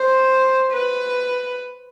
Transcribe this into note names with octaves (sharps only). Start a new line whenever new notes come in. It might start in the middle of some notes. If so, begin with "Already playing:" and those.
Already playing: C5
B4